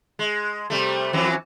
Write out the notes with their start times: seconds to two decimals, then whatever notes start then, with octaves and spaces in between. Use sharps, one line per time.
0.19 G#3
0.70 C3 G3 A3
1.13 F2 E3 F#3